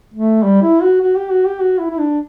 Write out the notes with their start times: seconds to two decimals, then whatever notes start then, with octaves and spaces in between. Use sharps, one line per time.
0.14 A3
0.43 G3
0.63 E4
0.82 F#4
1.01 F#4
1.16 G4
1.31 F#4
1.46 G4
1.60 F#4
1.79 E4
1.90 E4
1.98 D4